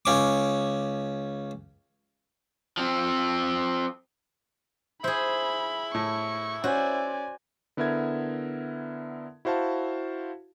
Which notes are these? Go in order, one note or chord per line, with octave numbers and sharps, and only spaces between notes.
C#2 C#4 D6
F3 C4
E4 G#4 C5 B5
A2 C#6
C#4 F#4 C5 D5 G#5
D3 B3 E4 A#4 E5 G#6
E4 F#4 C5 F5 A5